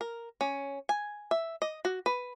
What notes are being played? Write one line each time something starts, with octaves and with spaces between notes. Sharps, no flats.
A#4
C#4
G#5
E5
D#5
F#4
B4